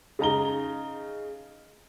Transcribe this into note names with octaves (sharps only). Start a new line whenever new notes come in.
C#3 D#4 A#5 G7